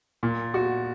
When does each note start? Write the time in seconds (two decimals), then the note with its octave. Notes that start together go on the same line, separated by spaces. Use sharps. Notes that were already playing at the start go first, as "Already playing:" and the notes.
0.23 A#2
0.54 F#4